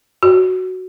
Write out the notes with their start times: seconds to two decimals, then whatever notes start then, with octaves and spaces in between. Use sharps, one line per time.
0.23 F#4